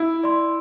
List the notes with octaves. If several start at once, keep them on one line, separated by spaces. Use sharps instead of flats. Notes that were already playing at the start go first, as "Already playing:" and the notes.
Already playing: E4
D5 C6